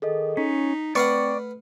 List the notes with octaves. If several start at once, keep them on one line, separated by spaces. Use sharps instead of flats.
D#3 G#4 A4 D#5
C#4 D#4 B6
A3 C4 B4 D5 F5 F#5 C#6